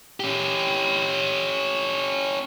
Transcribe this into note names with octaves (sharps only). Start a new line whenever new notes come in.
C#4 G4